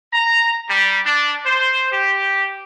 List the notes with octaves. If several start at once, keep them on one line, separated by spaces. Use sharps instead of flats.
A#5
G3
D4
C5
G4